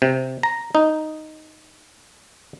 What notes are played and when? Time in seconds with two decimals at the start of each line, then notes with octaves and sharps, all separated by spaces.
0.02 C3
0.43 A#5
0.75 D#4